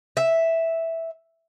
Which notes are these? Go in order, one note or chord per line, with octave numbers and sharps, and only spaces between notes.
E5